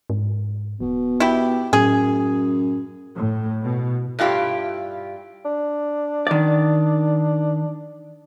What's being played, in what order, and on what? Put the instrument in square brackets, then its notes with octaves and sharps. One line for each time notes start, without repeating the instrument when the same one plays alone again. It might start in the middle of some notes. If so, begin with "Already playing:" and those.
[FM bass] G#2
[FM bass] D#1 [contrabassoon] B2
[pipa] E4 G4
[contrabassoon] F#2 [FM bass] A2 [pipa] G#4
[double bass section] A2
B2
[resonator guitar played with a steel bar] G2 E4 F4 G4
[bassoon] D4
[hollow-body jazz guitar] D#3 D5